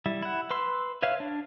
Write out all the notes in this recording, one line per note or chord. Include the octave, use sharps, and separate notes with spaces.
G3 E4
E4 F#5
B4 C6 E6
B4 C#5 E5 F5
D4